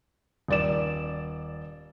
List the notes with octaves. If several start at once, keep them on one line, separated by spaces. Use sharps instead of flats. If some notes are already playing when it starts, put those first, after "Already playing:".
D#1 D5 E7